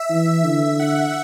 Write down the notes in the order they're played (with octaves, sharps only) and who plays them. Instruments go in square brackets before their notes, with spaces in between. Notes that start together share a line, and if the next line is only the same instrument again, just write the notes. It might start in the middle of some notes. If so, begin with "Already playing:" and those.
Already playing: [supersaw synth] E5
[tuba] E3
[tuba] D3 [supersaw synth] E5
[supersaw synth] F#5